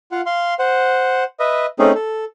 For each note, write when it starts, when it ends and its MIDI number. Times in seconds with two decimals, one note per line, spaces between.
0.12 0.21 65
0.12 0.21 77
0.12 0.21 78
0.26 0.54 77
0.26 0.54 84
0.59 1.24 72
0.59 1.24 78
1.40 1.66 71
1.40 1.66 75
1.40 1.66 76
1.79 1.92 57
1.79 1.92 60
1.79 1.92 61
1.79 1.92 63
1.79 1.92 68
1.95 2.25 69